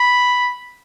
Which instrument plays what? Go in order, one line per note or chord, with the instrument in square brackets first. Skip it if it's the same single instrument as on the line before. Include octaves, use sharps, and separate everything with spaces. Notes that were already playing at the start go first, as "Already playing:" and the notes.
Already playing: [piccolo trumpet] B5